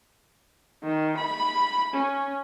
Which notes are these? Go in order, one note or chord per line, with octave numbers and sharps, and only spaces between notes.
D#3
B5
C#4